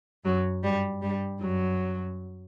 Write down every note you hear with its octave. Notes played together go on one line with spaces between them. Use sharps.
F#2 F#3
G2 G3
G2 G3
F#2 F#3